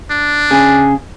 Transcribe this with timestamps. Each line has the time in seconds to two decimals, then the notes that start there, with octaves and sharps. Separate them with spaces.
0.10 D4
0.51 C#3 G#4